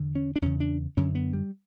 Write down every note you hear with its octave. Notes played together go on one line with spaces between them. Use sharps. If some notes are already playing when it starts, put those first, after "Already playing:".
Already playing: E2 D3
C#4
D4
E2 C#3 C#4
D4
F#2 D3 C#4
B3
G3